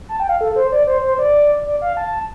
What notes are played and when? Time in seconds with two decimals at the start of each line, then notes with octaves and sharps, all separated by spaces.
0.09 A5
0.20 G5
0.29 F5
0.41 A4
0.56 C5
0.72 D5
0.87 C5
1.02 C5
1.18 D5
1.65 D5
1.82 F5
1.97 A5